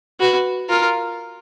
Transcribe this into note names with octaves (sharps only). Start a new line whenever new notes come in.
F#4 B4
F4 A#4